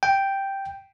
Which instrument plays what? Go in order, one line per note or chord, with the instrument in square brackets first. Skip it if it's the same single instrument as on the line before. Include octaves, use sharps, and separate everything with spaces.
[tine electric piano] G5